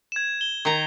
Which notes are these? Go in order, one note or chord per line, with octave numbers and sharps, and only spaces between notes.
G#6 E7
G7
D#3 A#5